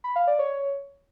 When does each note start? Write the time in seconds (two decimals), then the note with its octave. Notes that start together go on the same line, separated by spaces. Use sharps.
0.04 B5
0.16 F5
0.27 D5
0.39 C#5